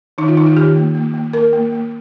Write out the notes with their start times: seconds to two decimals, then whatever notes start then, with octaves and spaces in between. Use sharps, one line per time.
0.18 D#3 D#4
0.28 F4
0.37 D#3 D#4
0.46 F4
0.56 D#3 G4
0.76 A#3
0.95 A#3
1.14 A#3
1.33 A#3 A#4
1.53 A#3
1.72 A#3